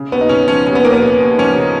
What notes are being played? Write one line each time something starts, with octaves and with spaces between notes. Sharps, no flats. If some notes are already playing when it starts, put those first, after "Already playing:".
Already playing: C#3
D#2 B3
D#4
C#3 C#4
F3 C#4
D#2 C#4
B3
D#2 A#3
B3
C#3
D#2
F3 C#4
C#3